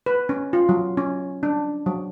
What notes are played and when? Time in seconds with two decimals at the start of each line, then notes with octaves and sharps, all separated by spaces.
0.06 B4
0.29 C#4
0.53 F4
0.69 F#3
0.97 C#4
1.43 D4
1.86 F#3